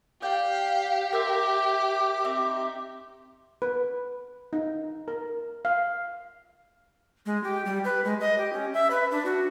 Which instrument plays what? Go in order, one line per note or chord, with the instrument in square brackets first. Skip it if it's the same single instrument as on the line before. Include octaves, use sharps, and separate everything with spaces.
[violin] G4 [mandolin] D5 G5 [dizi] F5
[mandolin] A#4 C5 E5 [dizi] D6
[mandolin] C4 D#4 E5
[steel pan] B4
D#4
A#4
F5
[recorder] G#3
G4
G3
B4
G#3
D#5
G4
C#4
E5
B4
D4
F#4